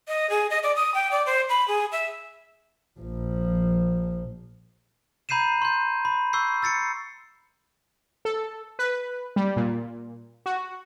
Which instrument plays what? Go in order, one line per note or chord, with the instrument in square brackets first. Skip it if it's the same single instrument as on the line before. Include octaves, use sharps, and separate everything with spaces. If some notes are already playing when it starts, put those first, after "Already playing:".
[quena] D#5
G#4
D#5
D5
D#6
G5
D5
C5
B5
G#4
E5
[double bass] A#1 F3
[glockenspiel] A#5 B5 G6 C7 D#7 E7
C6 G6
B5
C#6 E6 G6 C7
E6 A6 C7 C#7
[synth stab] A4
B4
G3
A#2
F#4